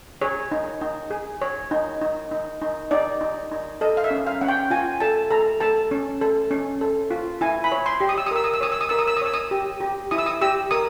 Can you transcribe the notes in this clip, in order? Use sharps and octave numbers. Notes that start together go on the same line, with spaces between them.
G#4 C#5
D#4
D#4
G#4
C#5
D#4
D#4
D#4
D#4
D#4 D5
D#4
D#4
A4 D#5
F5
E5
C#4
F5
C#4 F#5
G5
F4 G#5
A4 A5
A4 A#5
A4 A5
C#4
A4
C#4
A4
F4
E4 G#5
B5
C#5
C6
G4
D#6
E6
D#6
A#4 E6
D#6
E6
C#5 D#6
E6
D#6
A#4 E6
D#6
E6
D#6
C#5 E6
D#6
G4
G4
E4 D#6
E6
D#6
G4 E6
A#4 D#6